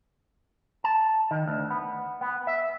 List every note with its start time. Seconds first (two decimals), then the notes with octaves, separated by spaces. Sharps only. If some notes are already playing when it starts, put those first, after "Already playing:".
0.84 A5
1.31 D#3
1.47 D2
1.70 B3
2.21 B3
2.47 E5